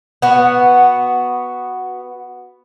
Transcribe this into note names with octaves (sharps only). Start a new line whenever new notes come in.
B3 F#4